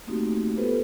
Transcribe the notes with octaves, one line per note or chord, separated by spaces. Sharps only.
A3 A#3 C4 D#4 F#4 G4
B3 F4 G4 A4 B4 C5